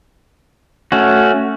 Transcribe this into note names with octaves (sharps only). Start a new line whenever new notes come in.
A3 C#4 F#4